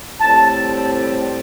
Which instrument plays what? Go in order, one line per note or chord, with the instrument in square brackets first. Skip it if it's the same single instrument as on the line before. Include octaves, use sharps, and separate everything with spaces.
[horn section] A2 G3 C4 A5